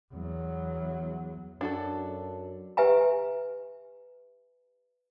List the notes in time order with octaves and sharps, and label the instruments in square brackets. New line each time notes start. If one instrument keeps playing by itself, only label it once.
[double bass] E2 F#3
[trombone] F#2 [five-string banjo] D4 F#4 A4
[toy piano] G4 B4 E5 G#5 A#5